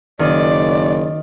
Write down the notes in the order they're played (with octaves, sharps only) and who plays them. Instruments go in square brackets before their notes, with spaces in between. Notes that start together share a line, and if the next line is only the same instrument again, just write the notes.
[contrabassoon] F#1 [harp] D#3 [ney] D5